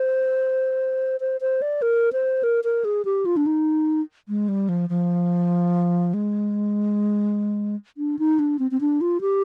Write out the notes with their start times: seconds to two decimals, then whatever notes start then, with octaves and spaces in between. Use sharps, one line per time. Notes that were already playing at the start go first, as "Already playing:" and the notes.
Already playing: C5
1.20 C5
1.41 C5
1.62 D5
1.82 A#4
2.13 C5
2.43 A#4
2.64 A#4
2.85 G#4
3.05 G4
3.25 F4
3.37 D4
3.46 D#4
4.28 G#3
4.48 G3
4.69 F3
4.89 F3
6.14 G#3
7.97 D4
8.19 D#4
8.39 D4
8.59 C4
8.71 C4
8.81 D4
9.01 F4
9.21 G4